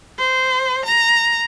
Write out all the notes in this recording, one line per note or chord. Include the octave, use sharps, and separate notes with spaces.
C5
A#5